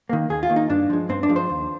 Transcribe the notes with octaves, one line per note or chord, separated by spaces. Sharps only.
D#3 A#3
D#2 G#4
F4
D#3 A#3
D#4
G2 D4
F3 G#3
G2 C4
D4
F3 G#3
C5
D#2